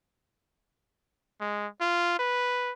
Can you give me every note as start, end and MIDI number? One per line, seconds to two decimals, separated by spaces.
1.41 1.67 56
1.81 2.19 65
2.19 2.72 71